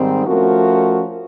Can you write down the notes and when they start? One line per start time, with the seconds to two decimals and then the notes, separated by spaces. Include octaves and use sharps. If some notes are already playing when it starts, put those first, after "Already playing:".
Already playing: G#2 D#3 G3 C4
0.26 F3 A3 C#4 F#4 A#4